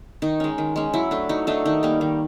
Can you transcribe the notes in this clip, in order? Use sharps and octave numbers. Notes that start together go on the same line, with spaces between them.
D#3 D#4
G#3 C#4
D#3
G#3 C#4
F#3 E4
A3 D4
F#3 D#4
A3 D4 D#4
D#3 D#4
G3 A#3
D#3